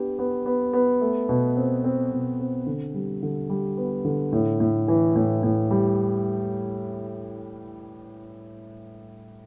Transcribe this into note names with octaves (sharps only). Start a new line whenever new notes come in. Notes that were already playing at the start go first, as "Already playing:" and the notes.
Already playing: B3 D4 G4
B3
B3
B3
A3
B2
C4
C4
B2
C4
D3
G3
D3
G3
B3
D3
A2
A2
E3
A2
A2
G3